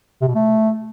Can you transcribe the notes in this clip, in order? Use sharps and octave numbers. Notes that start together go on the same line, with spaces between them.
C3
B2
A3